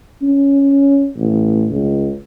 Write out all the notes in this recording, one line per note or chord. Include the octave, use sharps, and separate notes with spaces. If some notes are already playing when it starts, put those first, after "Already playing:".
C#4
A1
C#2